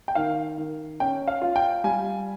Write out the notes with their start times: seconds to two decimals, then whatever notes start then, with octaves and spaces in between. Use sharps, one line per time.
0.08 G5
0.15 D#3 F5
0.58 D#3
1.00 C#4 G5
1.28 F5
1.42 F4
1.56 G5
1.84 G3 G#5